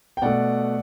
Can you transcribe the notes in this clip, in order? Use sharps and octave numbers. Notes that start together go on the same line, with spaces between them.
G5
B2 A3 D5 F#5